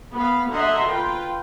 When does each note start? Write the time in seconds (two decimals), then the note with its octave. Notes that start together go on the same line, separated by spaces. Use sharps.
0.15 B3 F5 B5
0.51 D3 D#5 E5 F#5 A#5 C6
0.86 F4 B4 G5